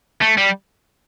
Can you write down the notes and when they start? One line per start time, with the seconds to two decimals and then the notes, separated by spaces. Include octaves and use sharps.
0.22 A3
0.38 G3